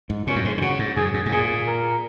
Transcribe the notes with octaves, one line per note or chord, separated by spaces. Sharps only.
G#2
A#2 C#4
F#2
G#2
D#3
C#3 F#4
G#2
F#2 G#4
F#2
G#2
A#2 G#4
A#4